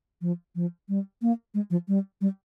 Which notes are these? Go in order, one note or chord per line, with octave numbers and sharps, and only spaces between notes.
F3
F3
G3
A#3
G#3
F3
G3
G3